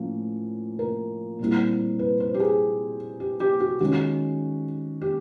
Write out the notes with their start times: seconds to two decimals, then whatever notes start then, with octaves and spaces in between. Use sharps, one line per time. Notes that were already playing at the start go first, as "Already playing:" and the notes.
Already playing: A2 F3 A#3 C#4
0.79 A#4
1.39 A#2 G3 C4 E4
1.99 B4
2.20 C5
2.34 G4
2.40 G#4
3.20 G4
3.40 G4
3.60 F#4
3.80 D#3 G#3 C#4 F#4
5.01 G4